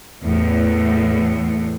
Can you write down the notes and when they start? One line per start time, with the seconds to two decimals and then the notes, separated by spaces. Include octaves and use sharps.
0.21 E2 A2